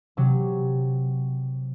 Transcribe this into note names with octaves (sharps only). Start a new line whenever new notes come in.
C3 F#3